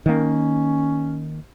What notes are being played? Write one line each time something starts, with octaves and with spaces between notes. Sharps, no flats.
D#3 A#3 C#4